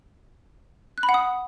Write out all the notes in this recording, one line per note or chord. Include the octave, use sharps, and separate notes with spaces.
F#6
B5
F#5
D#6